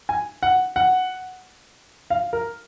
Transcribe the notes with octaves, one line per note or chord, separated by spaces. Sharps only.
G#5
F#5
F#5
F5
A#4